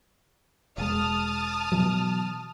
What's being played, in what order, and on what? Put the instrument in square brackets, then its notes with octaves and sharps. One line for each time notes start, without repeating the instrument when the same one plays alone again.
[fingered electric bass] E1 G#3 [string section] A5 D#6 F6
[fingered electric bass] B2 E3 F#3